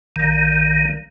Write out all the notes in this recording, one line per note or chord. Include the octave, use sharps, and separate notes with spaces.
A#1 D#3